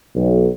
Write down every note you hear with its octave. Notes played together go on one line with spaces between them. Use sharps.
B1